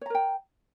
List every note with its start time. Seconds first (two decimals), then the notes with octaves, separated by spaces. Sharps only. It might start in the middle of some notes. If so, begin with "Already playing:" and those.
0.01 C#5
0.06 A#5
0.10 A#4
0.15 G5